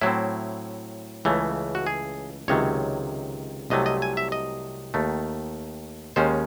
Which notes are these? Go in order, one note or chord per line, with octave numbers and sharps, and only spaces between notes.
A2 F#3 C4 E4
C#2 C#3 E3 A3
F#4
G#4
C#2 C3 D#3 F#3 C#5
C2 C3 F#3 A3 D#5
D#5
G#5
E5
D#5
D#2 D#3 A3
D#2 D#3 G#3 C#4 C5